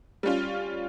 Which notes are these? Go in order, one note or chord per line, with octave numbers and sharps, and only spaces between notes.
G3 C#4 F4